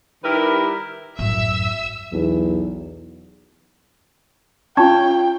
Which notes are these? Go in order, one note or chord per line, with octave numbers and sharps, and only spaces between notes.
D#3 G3 E4 G4 A#4 B4
A1 F#2 E5 E6
B1 E2
C#4 F4 G5 A5 C#6 G#6